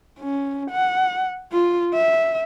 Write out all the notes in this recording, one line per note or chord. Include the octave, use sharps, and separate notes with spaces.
C#4
F#5
F4
E5